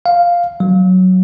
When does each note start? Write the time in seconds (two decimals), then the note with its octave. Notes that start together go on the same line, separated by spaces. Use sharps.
0.06 F5
0.60 F#3